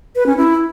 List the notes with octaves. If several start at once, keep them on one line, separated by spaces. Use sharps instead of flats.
B4
C#4
E4